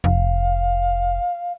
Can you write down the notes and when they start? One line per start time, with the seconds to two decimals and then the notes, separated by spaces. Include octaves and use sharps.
0.04 F1 F5